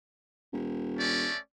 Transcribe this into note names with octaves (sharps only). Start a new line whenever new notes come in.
E1
A3 C#4 D5